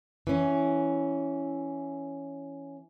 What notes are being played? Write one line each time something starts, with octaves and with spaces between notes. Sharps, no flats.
E3 C#4